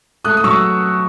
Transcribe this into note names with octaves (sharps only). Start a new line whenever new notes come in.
A3 D#6 F#6
D#6
F#3 C#6 E6